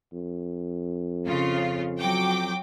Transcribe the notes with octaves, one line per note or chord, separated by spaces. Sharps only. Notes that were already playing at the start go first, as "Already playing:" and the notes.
F2
C#3 F4
F#3 G5 D6